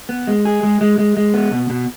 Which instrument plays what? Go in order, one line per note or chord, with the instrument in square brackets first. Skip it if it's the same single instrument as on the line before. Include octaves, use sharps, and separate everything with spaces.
[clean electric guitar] B3
G#3
G#4
G#3
G#3
G#3
G#3
B3
B2
B2